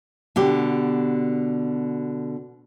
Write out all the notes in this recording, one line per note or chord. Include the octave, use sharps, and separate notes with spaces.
B2 D3 G4